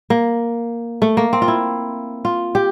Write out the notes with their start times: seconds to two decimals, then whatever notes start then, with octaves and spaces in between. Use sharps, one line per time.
0.10 A#3
1.02 A3
1.17 A#3
1.33 C4
1.42 F4
1.48 E4
2.25 F4
2.55 G4